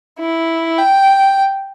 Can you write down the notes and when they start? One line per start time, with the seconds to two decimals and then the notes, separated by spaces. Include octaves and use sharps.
0.19 E4
0.78 G5